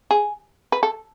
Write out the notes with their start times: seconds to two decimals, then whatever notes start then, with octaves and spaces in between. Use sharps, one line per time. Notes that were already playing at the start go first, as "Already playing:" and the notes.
0.11 G#4
0.72 B4
0.83 A4